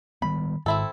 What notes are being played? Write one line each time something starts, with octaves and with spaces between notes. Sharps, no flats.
D#3 G3 B3 B5
G#2 D#3 C4 E4 A4